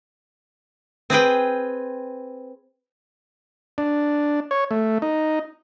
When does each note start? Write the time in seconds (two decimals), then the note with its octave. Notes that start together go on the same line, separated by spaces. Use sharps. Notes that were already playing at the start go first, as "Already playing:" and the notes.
1.10 C4 G#4 B4 G5
3.78 D4
4.51 C#5
4.71 A3
5.02 D#4